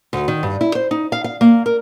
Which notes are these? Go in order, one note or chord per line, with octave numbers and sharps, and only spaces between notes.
D2
D#3
G2
E4
C5
D#4
F5
F5
A#3
A#4